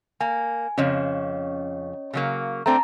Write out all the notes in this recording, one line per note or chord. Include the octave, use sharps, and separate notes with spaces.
A#3 G#5
F2 C#3 C#4 C#5 D#5
C#3 F#3 A#3
A3 C4 D4 A5 A#5